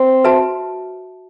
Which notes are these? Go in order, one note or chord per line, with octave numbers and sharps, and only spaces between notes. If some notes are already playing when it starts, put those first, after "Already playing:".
Already playing: C4
F#4 B4 E5 A5